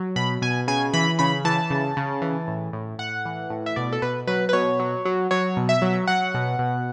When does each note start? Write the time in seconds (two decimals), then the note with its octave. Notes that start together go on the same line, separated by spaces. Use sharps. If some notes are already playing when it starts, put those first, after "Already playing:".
Already playing: F#3
0.16 B2 B5
0.42 B2 G#5
0.68 C#3 G#5
0.94 E3 B5
1.19 C#3 B5
1.45 E3 A5
1.70 C#3
1.97 C#3
2.22 E3
2.48 A2
2.73 A2
2.99 A2 F#5
3.25 E3
3.50 A2
3.66 E5
3.76 B2 D5
3.93 A4
4.02 B2 B4
4.27 F#3 B4
4.49 B4
4.53 B2 C#5
4.80 F#3
5.05 F#3
5.31 F#3 C#5
5.57 B2
5.69 E5
5.82 F#3
6.08 F#3 F#5
6.34 B2
6.59 B2